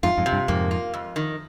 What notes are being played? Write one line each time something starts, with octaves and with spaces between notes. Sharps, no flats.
F2 G#2 F4
F2 G#2
C3
G2
F2 G#2 A#3
F4
F2
D#3